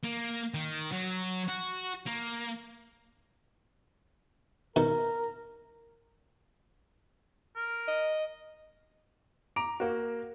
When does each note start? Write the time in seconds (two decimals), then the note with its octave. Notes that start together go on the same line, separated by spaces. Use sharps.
0.04 A#3
0.54 D#3
0.92 F#3
1.48 F#4
2.07 A#3
4.76 B2 D#3 A#4
7.56 A#4
7.88 D#5
9.56 A#5 D6 D7 F7
9.80 A#3 F#4